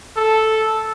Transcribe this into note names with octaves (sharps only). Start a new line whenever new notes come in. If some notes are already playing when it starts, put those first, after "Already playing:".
A4